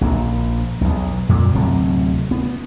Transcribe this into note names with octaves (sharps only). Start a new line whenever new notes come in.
A#1 A#3
B1 E2
F2 A#2 G3
D1 C3 F#3 A3
B3